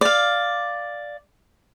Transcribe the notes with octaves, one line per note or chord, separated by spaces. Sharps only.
D5 F5